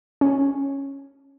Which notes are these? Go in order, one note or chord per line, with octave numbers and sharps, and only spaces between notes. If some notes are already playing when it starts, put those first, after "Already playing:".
C#4